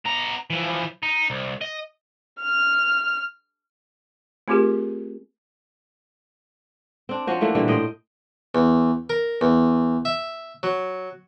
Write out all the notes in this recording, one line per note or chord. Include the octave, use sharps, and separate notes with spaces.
B3 A#5
E3 F3
D#4
C2
D#5
F6
A3 C4 F4 G4 G#4 A#4
C4 D4
F3 C#4 F#4 C5
E3 A3 A#3 D4
A#2 D3 E3 G3
A2 C5 D#5 G5
E2
A#4
E2
E5
F#3